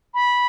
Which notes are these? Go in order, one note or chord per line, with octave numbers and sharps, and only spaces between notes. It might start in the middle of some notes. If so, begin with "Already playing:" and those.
B5